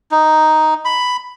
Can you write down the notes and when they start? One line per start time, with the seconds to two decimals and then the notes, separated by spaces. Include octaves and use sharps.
0.11 D#4
0.85 B5